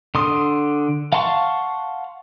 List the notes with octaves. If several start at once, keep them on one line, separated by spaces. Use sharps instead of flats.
D3 C6 D#6
F5 F#5 A5 C6 C#6